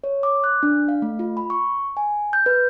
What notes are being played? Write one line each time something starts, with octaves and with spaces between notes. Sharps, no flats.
C#5
D6
F#6
D4
F5
A3
F4
B5
C#6
G#5
G6
B4